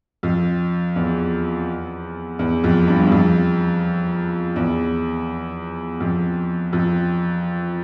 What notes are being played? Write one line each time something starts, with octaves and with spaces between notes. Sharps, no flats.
F2
E2
E2
F2
G2
E2
F2
E2
F2
F2